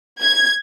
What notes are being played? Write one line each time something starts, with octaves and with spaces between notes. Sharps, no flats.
G#6